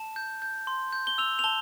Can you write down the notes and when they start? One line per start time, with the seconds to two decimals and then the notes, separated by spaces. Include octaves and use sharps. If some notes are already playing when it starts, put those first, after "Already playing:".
Already playing: A5
0.16 G6
0.42 G6
0.67 C6
0.93 G6
1.07 G7
1.18 E6 F7
1.39 F7
1.44 A5 G7